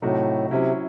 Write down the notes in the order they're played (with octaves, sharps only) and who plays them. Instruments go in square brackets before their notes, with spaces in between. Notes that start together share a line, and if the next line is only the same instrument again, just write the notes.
[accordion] A2 [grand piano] C3 F#3 A3 D#4 F#4
[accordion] C3 [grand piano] F#3 C#4 E4